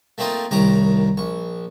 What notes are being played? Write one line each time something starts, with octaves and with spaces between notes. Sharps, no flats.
A3 A#3 C4 D#4 F4
C2 A2 D#3 A#5 C#6 D6
A#1 C#6